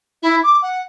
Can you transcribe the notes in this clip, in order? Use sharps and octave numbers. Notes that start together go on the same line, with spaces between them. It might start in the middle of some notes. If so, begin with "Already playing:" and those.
E4
D6
F#5